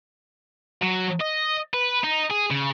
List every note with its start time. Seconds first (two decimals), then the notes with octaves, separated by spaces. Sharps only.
0.82 F#3
1.20 D#5
1.74 B4
2.04 D#4
2.30 G#4
2.51 C#3